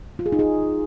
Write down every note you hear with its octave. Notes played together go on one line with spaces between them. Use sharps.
F4
G#4
D#4
G#4